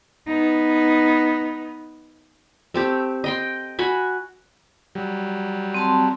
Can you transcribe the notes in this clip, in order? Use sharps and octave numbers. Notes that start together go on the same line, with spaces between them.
B3 D#4
A3 C4 G4
D#5 G5 C6
F#4 G#5 B5
F#3 G3
C4 A5 C6